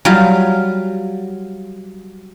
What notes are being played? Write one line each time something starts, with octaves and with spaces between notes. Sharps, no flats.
F#3 G3 F4